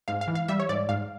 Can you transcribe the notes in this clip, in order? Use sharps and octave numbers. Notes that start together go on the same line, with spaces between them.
G#2 F5
F5
E3
F5
G3 E5
C#5
G#2 D5
G#2 F5